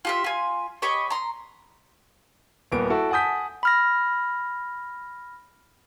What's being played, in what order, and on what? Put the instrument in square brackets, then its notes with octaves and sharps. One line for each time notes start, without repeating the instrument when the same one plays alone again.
[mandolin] F4 G4 E5
F4 G#5
G4 C#5 D#5 B5
A#5 C6
[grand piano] D#1 A#3 B3 D7
E4 F#4 A4
F#5 G#5 A5 D#6 G6 B6
[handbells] B5 F6 A#6